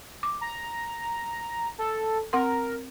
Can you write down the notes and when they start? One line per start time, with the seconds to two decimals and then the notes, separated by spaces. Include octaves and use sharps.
0.23 D6
0.41 A#5
1.78 A4
2.33 C4 A#4 F#5 C6